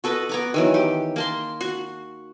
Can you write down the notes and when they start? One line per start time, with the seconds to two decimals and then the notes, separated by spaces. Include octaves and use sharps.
0.04 F#4 A4 B4 D#5
0.29 B3 A#5 D6
0.54 D#3 E3 F#3
0.74 G4
1.16 A#3 A5 C6
1.61 F#4